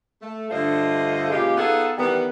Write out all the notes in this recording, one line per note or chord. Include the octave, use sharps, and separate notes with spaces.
A3
G2 D3 A3 F4 C5 D#5
A#2 C#3 G#3 F4 G4
B3 D#4 F4 G#4 A4
D#3 E3 G3 B3